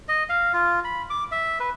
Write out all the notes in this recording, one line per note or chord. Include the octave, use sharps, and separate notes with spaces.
D#5
F5
F4
B5
D6
E5
B4